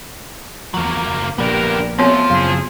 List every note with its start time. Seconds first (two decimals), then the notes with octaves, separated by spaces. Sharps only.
0.74 E2 F3 F#3 A#3
1.06 F#1
1.38 A#1 F3 A#3 B3 D4 G4 A#4
1.99 F3 F#3 G#3 A3 B3 C4 C#5
2.30 F#2 C#3 F#3 A3 E4 G#4 F5